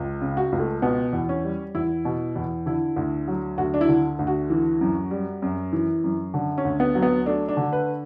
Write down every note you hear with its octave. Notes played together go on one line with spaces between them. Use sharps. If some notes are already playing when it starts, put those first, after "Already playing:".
Already playing: C#2
C#3
F#4
C#2
A3
B2 B3
E2
C#4
G3
E2 E4
B2
E2
D3 E4
D2
F#3
D2 F#4
D4
E4
D3
D2
F#4
E3
F#2
G3
F#2
E3
F#2
D3
C#4
D2
B3
F#3
B3
A3 D4
D4
D3
B4